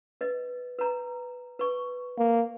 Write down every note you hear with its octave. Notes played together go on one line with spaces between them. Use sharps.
B4 D#5
B4 A#5
B4 C#6
A#3